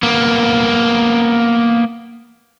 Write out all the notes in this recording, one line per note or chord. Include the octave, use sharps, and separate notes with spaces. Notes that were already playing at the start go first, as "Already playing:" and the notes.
A#3 B3